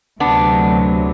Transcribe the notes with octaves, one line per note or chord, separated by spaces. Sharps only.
D2 C3 F#3 B3 D4